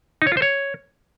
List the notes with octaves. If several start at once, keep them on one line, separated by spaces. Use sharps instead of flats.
D#4
C#5
F4
C5
C#5